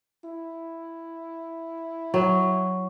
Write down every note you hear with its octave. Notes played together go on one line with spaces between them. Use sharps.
E4
F#3